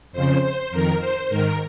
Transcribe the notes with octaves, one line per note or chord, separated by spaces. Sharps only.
F2 C#3 C5
C5
F2 D#3 A#4
C5
G#2 D#3 A#4